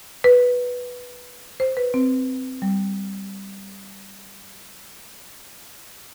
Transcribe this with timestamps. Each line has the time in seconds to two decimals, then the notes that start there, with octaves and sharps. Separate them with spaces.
0.24 B4
1.60 C5
1.77 B4
1.94 C4
2.62 G3